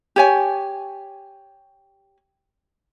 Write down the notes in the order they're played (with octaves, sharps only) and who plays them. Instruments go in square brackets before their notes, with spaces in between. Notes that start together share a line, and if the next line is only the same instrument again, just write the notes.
[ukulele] G4 C#5 G#5